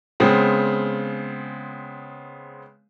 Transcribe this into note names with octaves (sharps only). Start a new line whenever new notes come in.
C#3 G#3 B3 C4